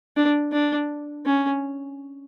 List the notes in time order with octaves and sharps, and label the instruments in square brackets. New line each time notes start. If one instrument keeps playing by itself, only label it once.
[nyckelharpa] D4
D4
C#4